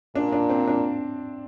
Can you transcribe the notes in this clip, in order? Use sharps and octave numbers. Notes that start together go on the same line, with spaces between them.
A#2 D4
D4
C4
D4